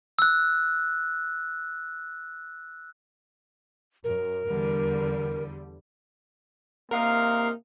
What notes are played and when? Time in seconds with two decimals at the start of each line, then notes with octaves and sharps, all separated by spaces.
0.19 E6 F#6
4.04 F#2 A#4
4.47 E2 D3 G3
6.91 C3 A#3 D#4 A#4 F5 C7